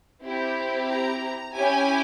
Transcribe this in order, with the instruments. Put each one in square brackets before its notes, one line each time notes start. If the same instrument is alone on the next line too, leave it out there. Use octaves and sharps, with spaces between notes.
[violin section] C4 E4 G4
A#5
C#4 E4 G4 G#5